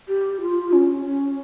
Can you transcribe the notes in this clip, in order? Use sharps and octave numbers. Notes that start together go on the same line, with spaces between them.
G4
F4
C#4
C#4